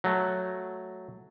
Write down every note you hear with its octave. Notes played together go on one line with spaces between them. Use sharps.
F#3 A3